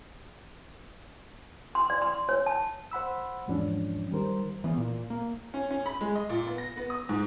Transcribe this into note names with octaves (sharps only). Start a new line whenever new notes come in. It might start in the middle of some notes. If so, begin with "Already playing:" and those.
C6
D5
C6
C#5
A5
C5 F#5 B5 E6
E2 G#2 F3 C#4 D4
D#3 G3 A#4 C5
E3 B3
A#2
A#3
C#4
C#4
B5
G#3
D#5
A#2
B3
A#6
B3
D#6
G#2